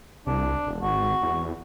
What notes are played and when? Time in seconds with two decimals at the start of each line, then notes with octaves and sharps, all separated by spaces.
0.27 C2 D4
0.67 E1
0.82 G#1 F#4
1.22 E2